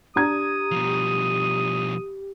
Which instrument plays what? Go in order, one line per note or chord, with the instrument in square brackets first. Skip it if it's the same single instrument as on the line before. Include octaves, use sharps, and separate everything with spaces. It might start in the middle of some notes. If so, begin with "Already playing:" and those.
[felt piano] D4 A#5 G#6 [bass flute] G4 [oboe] D#6
[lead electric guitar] B2 F3